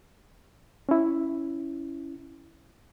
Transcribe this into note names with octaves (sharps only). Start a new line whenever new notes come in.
C#4 E4